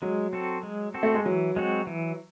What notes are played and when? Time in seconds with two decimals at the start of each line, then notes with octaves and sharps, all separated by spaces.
0.02 F#3 G#3
0.33 C4 F#4 A4
0.63 G#3
0.94 C4 F#4 A4
1.03 A3
1.14 G#3
1.25 E3 F#3
1.56 G#3 C4 F#4
1.87 E3